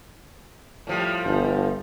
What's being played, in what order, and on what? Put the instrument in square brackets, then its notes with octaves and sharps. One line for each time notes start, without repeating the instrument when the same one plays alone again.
[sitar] A2 F3 G3
[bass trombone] G1